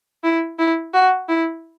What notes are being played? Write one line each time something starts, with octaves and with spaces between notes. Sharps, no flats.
E4
E4
F#4
E4